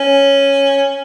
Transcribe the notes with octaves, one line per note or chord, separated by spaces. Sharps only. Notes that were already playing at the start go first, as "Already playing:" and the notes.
Already playing: C#4